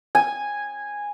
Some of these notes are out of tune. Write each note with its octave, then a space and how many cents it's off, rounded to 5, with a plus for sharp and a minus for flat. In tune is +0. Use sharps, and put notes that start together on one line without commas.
G#5 -10